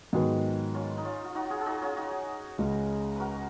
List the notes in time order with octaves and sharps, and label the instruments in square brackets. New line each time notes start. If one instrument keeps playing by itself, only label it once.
[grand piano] G#2 D#3 F#3 B3 [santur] F4 G#4
[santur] C#4 F4
D#4
C#4 F4
F4
D#4 F#4
F4 F#4 G#4
G#4
D#4 F#4
C#4 F4
D#4 F#4
[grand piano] C#2 C#3 G#3
[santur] F#4 A#4 B4